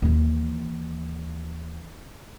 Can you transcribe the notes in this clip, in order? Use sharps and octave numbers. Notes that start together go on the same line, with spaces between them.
D#2 E3